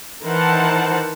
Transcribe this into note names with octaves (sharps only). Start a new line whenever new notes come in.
D#3 E3 A#4 C5 F#5 A5